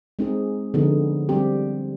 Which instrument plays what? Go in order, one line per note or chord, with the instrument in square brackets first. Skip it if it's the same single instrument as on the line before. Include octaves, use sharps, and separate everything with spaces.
[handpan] G#3 C4 D#4 G#4
D3 F3 B3 D#4 G#4
G3 C4 G4